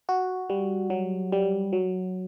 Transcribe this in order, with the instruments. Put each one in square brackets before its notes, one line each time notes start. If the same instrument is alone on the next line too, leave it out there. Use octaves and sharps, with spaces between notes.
[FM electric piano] F#4
G3
F#3
G3
F#3